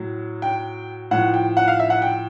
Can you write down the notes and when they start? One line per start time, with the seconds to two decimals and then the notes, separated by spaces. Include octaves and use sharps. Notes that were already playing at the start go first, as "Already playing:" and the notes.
Already playing: A2 F#3
0.42 G5
1.11 A2 F3 F#5
1.34 G5
1.57 F#5
1.68 F5
1.79 E5
1.90 F#5
2.02 G5